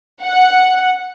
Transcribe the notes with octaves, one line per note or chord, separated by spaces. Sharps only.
F#5